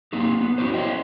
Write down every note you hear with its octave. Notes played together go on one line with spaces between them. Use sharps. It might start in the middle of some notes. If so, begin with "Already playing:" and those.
A#3 C4 D#4 G4
B3
C#4 E4 F#4 G4 C5
C5 C#5 D#5 G5